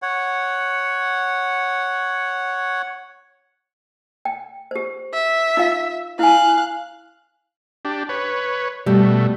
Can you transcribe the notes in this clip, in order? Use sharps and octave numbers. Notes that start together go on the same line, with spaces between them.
C#5 F#5
G5
G4 C5
E5
D#4 F4 F5
E4 F5 G#5 F#6
D4 G4
B4 C#5
B2 G3 A3